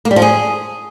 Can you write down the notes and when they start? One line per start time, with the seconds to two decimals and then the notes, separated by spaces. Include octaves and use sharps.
0.05 A#3
0.11 G3
0.16 F3
0.22 G#4